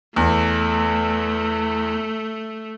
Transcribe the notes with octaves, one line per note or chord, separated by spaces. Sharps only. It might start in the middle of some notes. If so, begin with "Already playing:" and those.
E2 A3